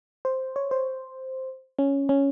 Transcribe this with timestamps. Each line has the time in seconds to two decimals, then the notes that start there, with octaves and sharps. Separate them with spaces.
0.25 C5
0.56 C#5
0.71 C5
1.79 C#4
2.09 C#4